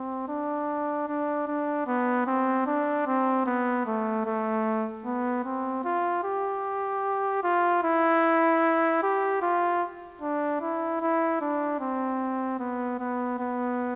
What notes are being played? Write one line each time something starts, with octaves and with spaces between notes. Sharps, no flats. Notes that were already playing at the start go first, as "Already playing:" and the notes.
Already playing: C4
D4
D4
D4
B3
C4
D4
C4
B3
A3
A3
B3
C4
F4
G4
F4
E4
G4
F4
D4
E4
E4
D4
C4
B3
B3
B3